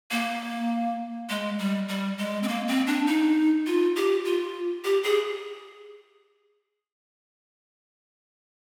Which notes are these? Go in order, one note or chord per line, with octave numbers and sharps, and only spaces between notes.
A#3
G#3
G3
G3
G#3
C4
A#3
C4
D4
D#4
F4
G4
F4
G4
G#4